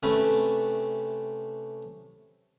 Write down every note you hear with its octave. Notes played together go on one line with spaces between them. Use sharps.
C3 A3 C#4 A4 B4